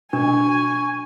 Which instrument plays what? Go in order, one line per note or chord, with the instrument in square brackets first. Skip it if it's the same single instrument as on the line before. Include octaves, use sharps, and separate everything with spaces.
[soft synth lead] B2 [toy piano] D4 [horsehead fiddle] G#5 [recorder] C#6